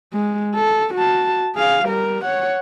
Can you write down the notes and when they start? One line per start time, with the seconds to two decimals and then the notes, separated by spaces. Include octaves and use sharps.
0.13 G#3
0.55 A4
0.95 F#4 A5
1.55 G#4 F5
1.86 G3 A#4
2.24 C#5 F#5